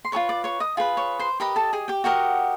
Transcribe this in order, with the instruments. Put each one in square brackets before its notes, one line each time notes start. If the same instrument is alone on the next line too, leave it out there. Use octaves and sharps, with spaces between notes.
[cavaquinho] C6
F4 G#4 B4 C#5 C#6
D5 D6
C#5 C#6
D#5 D#6
F4 G#4 B4
C#5 C#6
C5 C6
G4 A#4 B4 D#5 B5
A4 A5
G#4 G#5
G4 G5
F#4 G4 A#4 D#5 F#5